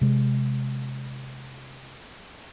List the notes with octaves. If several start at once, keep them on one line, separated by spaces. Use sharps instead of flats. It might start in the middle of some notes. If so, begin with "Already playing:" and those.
C3 G#3